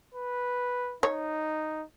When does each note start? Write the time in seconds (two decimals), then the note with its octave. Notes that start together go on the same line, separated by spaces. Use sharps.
0.14 B4
1.03 D#4 C#5